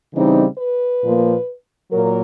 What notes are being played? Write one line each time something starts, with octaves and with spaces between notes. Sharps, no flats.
C#3 E3 G3 C4 D#4
B4
A#2 F3 A#3
A#2 F#3 A#3 A#4